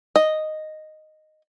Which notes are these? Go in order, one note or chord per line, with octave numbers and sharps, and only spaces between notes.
D#5